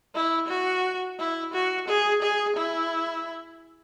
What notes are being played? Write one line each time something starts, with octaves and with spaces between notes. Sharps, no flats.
E4
F#4
E4
F#4
G#4
G#4
E4